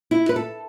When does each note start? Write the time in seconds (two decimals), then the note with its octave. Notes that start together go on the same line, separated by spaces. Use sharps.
0.11 E4
0.29 B4
0.36 A4